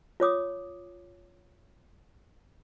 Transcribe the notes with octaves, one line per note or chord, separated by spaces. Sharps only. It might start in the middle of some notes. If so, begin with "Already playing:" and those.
F4 C#5 D6 D#6